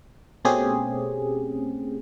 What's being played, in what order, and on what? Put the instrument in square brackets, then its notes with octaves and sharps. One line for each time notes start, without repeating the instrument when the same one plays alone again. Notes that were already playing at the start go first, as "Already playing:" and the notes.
[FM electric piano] B2 A3 C4 C#4 G4 G#4